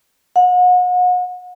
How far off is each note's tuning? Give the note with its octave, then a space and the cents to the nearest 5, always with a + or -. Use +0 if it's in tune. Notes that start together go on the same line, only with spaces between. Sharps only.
F#5 -40